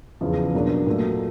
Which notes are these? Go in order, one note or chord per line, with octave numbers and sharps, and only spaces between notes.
E2 C#3 F3
B2 F#3 A#3 D4
A#2 F#3 A3